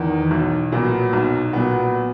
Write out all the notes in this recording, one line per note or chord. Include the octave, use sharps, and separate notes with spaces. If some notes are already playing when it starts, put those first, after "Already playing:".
Already playing: E2 D#3
B1
A#2 F#3 B3
B1
A#2 F#3 B3